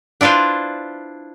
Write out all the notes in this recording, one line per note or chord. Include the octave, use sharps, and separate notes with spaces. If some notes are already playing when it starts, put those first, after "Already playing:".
D4 E4 F4 B4 C5